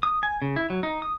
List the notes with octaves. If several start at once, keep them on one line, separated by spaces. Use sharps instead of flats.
D#6
G#5
C#3
E4
F#3
D#4
D#6